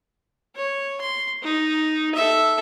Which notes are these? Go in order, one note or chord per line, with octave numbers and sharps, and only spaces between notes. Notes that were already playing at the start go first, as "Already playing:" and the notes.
C#5
C6
D#4
A4 E5